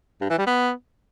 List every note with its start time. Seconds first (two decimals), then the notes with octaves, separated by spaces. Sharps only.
0.21 G2
0.30 E3
0.38 G3
0.47 B3